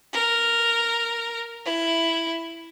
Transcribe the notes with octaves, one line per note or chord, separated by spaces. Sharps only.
A#4
E4